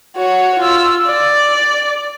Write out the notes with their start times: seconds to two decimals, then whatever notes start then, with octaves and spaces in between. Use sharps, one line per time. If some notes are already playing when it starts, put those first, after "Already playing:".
0.16 F#4 C#5
0.59 F4 E6
1.06 D5